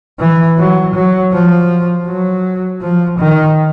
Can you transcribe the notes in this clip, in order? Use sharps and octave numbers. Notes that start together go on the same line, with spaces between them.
E3
F#3
F#3
F3
F#3
F3
D#3